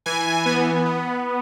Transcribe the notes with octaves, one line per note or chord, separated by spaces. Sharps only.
E3 G#5
B3
B3